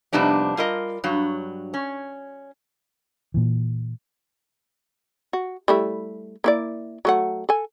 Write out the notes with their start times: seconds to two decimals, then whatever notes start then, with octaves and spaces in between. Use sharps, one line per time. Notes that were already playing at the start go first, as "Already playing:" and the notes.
0.13 F2 C3 G3 B3 D4 D#4
0.57 G3 F4 A#4 D#5
1.04 G2 F#3
1.74 C#4
3.34 A#2 E3
5.33 F#4
5.68 G3 A3 E4
6.44 A#3 E4 D5
7.05 F#3 A3 F#5
7.49 A4 G#5